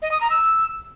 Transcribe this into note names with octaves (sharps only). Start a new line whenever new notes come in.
D#5
D#6
A#5
E6